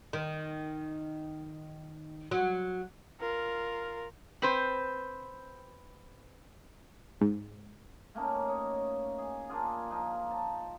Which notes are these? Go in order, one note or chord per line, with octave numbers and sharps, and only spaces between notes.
D#3
F#3
F4 A#4
C4 B4 C5
G#2
A3 A#3 C#4 D#4
C#5 D#5
G#4
A#3 D4 F4 G#4
F3 A#3 D#4
A5